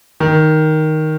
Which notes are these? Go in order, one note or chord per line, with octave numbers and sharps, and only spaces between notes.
D#3